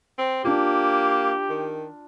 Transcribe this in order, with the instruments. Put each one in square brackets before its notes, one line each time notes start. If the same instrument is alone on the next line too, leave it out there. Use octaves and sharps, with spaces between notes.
[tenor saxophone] C4
[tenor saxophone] A#3 [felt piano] D4 F4 [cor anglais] G4
[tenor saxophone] D#3